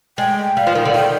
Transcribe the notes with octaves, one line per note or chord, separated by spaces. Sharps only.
G#3 G5
G3 F5
F3
D#3
D3
D#3 G5